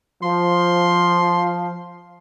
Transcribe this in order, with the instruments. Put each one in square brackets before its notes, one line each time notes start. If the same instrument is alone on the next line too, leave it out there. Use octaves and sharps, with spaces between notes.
[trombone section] F3 [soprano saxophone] C6